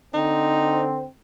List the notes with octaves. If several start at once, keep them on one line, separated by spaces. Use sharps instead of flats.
D3 C4 D#4